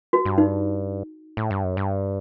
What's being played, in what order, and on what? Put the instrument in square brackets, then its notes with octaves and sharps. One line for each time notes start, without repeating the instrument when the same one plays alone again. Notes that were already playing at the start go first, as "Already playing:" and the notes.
[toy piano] F#4
[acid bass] G2
[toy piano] D#4
[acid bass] A2
G2
F#2
G2